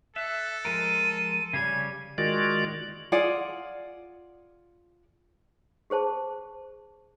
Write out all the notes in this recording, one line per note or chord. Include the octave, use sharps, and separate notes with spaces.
A4 E5 F#6
F3 G#3 A#4 D#7
C#3 G3 C#4 G#6
D#3 G#3 F4 F#4 D5
F4 G#4 D5 F#5
G4 G#4 C5 A5